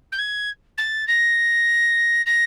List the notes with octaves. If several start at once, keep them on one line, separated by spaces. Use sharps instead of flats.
G6
G#6
A6
A#6
A#6